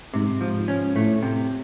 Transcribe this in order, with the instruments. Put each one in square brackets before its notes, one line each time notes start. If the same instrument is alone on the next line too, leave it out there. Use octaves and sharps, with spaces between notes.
[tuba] G#2 [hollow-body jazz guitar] C3
[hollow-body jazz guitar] F3
[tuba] G#2
[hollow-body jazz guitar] C#4
[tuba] A2 [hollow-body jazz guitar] A3
[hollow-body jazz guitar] C3